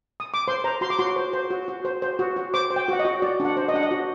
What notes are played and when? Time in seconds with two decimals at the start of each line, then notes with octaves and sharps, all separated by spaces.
0.20 D#6
0.34 D6
0.48 C5 C6
0.64 C5 A#5
0.81 F#4 C6
0.90 D6
0.99 F#4 C6
1.16 C5
1.33 C5
1.50 F#4
1.68 F#4
1.85 C5
2.02 C5
2.19 F#4
2.36 F#4
2.54 C5 D6
2.70 C5
2.76 G5
2.88 F#4 F#5
2.99 D#5
3.05 F#4
3.22 F#4 D5
3.40 D4
3.45 F#5
3.57 C5
3.68 D#5
3.74 D4 F#5
3.83 D#5
3.91 F#4